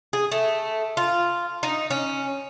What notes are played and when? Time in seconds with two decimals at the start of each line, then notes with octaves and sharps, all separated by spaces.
0.13 G#4
0.32 A3
0.97 F4
1.63 D#4
1.91 C#4